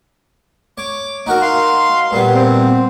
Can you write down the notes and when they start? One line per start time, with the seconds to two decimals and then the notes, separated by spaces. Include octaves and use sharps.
0.78 C#5 D6
1.26 D#4 F#4 A#4
1.42 F5 C6
2.11 G2 A#2 B3
2.35 C4